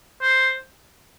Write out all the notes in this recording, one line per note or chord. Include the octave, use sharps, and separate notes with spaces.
C5